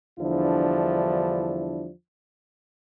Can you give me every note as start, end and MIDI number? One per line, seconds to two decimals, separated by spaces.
0.20 1.90 40
0.20 1.90 50
0.20 1.90 53
0.20 1.90 55
0.20 1.90 62
0.20 1.90 64